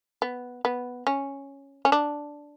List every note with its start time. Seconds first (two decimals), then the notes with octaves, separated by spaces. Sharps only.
0.22 B3
0.65 B3
1.07 C#4
1.85 C#4
1.92 D4